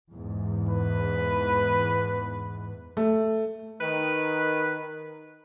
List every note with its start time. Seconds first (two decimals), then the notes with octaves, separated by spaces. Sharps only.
0.12 E2 G#2
0.69 B4
2.97 A3
3.81 D#3 B4